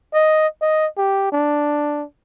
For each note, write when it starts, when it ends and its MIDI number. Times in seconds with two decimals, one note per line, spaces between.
0.14 0.47 75
0.61 0.87 75
0.98 1.28 67
1.32 2.05 62